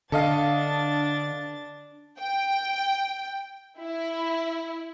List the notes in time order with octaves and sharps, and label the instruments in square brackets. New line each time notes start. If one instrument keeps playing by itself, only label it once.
[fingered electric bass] D3 [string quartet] D4 A6 [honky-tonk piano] A4 D#5 F5
[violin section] G5
E4